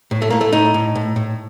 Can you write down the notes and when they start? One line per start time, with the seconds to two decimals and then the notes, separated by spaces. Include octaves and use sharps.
0.11 A2
0.22 A3
0.30 A2 A#3
0.41 A3
0.53 A2 D#4
0.74 A2
0.95 A2
1.16 A2